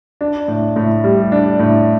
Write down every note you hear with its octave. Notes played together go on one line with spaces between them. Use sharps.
D4
A2
A2
G3
D4
A2